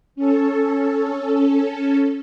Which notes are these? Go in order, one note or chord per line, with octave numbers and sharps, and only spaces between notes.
C#4 A4